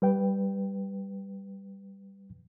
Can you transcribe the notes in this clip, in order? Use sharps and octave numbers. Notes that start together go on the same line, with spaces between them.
G3 B4 G5